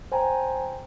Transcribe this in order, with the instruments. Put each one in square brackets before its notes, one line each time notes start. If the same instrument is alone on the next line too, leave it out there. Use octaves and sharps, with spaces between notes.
[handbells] C5 G5 G#5 A#5